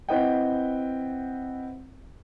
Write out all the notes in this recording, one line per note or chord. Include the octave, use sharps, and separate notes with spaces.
C4 E4 B4 D#5 F#5 G5